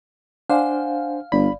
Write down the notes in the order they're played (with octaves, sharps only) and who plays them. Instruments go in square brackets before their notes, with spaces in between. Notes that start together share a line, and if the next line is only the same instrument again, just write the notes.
[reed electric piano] D4 C5 [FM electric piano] F5 [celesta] F#5 G#5
[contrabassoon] G1 [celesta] D5 [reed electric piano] B5